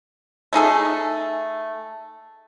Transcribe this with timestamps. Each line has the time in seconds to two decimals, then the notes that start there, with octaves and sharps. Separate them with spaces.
0.53 A3 D#4 G#4 A4